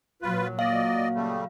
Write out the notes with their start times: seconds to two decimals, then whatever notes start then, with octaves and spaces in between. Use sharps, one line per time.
0.22 A#2 F#3 F4 B4
0.59 A#3 D5 D#5 F5
1.14 C#3 G3 A3